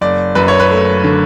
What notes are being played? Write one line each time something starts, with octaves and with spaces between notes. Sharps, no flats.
F#1 D5
F#2 B4
C#5
B4
A3
D3